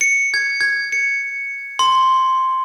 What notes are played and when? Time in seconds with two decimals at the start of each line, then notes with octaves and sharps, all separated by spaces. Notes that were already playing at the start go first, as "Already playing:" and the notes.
0.01 C#7
0.34 G#6
0.61 G#6
0.92 C#7
1.79 C6